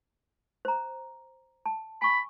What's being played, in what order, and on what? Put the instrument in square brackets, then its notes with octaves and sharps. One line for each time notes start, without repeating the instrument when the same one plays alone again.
[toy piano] C5 A#5
A5
[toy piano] G#5 C#6 [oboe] B5